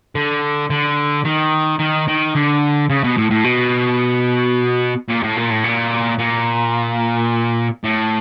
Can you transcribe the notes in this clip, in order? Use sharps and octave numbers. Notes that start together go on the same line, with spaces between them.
D3
D3
D#3
D#3
D#3
D3
C#3
B2
A2
A2
B2
A#2
A2
A#2
A2
A#2
A#2
A2